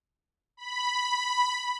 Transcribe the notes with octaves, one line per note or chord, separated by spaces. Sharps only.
B5